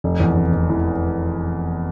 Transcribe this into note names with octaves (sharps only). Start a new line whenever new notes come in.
F1
E2
F1
F1
E3